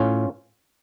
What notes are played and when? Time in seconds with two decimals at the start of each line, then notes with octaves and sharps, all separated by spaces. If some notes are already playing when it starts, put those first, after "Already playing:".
Already playing: A2 C#4 F4